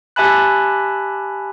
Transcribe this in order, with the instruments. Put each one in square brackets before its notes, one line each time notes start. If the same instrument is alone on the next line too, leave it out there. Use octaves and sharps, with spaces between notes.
[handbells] G4 E5 G#5 A5 B5 F#6